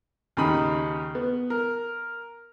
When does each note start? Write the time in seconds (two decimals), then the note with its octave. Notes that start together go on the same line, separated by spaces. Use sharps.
0.37 D#2 C#3 D#4 B5 D#6
1.15 B3
1.50 A#4